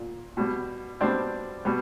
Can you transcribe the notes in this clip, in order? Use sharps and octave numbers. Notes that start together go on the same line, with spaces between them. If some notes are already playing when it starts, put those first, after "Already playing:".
Already playing: A#2
B2 G3
B2 G3 C4 D4
B2 G3